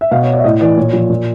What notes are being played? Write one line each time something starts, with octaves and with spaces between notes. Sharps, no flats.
E5
B2 F5
C#5
D5
E5
A2 D#5
E3 D5
A#2 C#5
F3
A#2